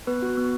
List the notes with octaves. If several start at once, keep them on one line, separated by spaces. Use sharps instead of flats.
B3 B4
F#4
B3